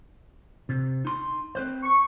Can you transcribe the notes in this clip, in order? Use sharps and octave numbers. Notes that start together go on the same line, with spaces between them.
C3
D#4 C6
C4 B4 C5
C#6